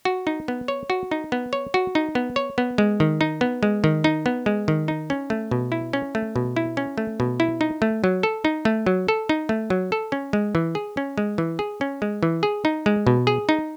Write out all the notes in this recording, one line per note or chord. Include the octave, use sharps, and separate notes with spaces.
F#4
D#4
B3
C#5
F#4
D#4
B3
C#5
F#4
D#4
B3
C#5
B3
G#3
D#3
D#4
B3
G#3
D#3
D#4
B3
G#3
D#3
D#4
C#4
A3
B2
E4
C#4
A3
B2
E4
C#4
A3
B2
E4
D#4
A3
F#3
A4
D#4
A3
F#3
A4
D#4
A3
F#3
A4
C#4
G#3
E3
G#4
C#4
G#3
E3
G#4
C#4
G#3
E3
G#4
D#4
G#3
B2
G#4
D#4